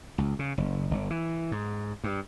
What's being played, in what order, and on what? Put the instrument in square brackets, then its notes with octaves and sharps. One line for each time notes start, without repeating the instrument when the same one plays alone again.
[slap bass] C#2
C#3
F#1
G1
E3
G#2
G2